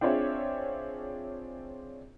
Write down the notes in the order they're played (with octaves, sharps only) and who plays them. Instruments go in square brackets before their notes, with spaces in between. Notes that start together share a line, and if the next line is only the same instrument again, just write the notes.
[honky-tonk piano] C4 D4 F4 G#4 C#5 E5